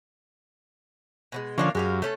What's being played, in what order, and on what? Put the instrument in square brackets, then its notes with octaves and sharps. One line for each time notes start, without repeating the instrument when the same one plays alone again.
[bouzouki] B2 F#3 G#3
[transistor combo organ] D3 F3 C#4 [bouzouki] A#3 D4 F5
[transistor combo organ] F#2 [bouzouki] G#3 G4 F5
[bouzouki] A3 C#4 A4